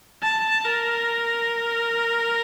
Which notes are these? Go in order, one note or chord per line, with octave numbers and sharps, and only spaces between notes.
A5
A#4